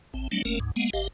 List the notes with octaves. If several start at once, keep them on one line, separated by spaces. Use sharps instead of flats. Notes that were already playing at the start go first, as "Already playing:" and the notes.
A1 C4
F#3 G3 A3 C4 D4
F#1 A3 A#3 C#4 A#4
D2 G#2
G#3 A#3 B3
G#1 G4 D#5 F5